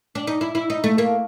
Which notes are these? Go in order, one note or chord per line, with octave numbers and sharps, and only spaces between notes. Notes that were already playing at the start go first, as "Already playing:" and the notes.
D4
D#4
E4
E4
D#4
A3
A#3